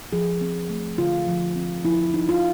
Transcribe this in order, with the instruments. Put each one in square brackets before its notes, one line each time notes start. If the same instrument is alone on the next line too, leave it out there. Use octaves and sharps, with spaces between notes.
[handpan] F3 G#4
C4
A3
D3 F4
F3
C4
F3 E4
D#4
F4